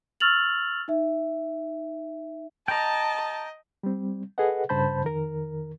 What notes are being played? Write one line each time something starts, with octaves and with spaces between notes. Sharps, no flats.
C#6 E6 F6 A6 F7 F#7
D#4 E5
D#5 G5 A5 A#5
G3 C4
G#4 A4 B4 D#5 F#5
G2 C#3 C5 A5 B5 G6
F2 D#3 A#4